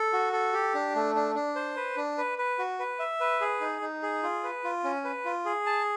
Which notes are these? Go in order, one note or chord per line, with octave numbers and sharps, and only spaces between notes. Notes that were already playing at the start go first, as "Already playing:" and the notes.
Already playing: A4
F#4
A4
G4
D4
A3
D4
D4
C5
B4
D4
B4
B4
F#4
B4
E5
B4
G#4
D#4
D#4
G#4
F4
B4
F4
C#4
B4
F4
G#4
A5